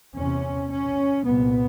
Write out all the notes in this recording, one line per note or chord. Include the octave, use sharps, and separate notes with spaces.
E2 C3 C#4
C#4
C2 A#2 B3